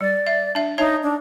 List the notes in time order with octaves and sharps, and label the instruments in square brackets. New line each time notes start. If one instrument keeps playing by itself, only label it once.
[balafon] G3 [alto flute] D5
[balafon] E5
D4 E5
[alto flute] D#4 [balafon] C#5 E5 A5
[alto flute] D4